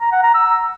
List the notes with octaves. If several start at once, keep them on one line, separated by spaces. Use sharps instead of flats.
A#5
F#5
A#5
E6